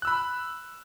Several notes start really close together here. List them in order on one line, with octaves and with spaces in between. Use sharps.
F#6 E6 B5